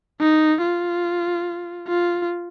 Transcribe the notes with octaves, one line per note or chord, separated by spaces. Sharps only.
D#4
F4
F4